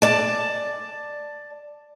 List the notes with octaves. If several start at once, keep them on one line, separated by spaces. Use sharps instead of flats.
D5 A5